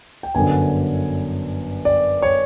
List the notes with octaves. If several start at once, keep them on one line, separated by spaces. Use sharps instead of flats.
G5
G1 F#2 D3 G#5
D5
C#5